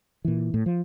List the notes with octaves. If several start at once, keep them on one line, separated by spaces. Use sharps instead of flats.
A#2 E3
A2
F3